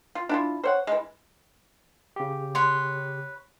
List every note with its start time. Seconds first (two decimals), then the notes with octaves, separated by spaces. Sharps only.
0.15 F4
0.29 D4 E4 F4
0.64 C5 C#5 F#5
0.87 E3 G#3
2.16 C#3 G4
2.55 B4 C#5 C6